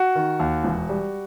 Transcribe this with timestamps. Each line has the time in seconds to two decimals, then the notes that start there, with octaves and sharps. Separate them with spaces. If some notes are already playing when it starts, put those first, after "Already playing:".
Already playing: F#4
0.15 D#3
0.40 D#2
0.64 E1
0.89 G3